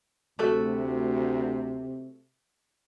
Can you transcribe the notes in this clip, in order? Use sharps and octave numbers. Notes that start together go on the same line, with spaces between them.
D2 C3 A3 F#4 A4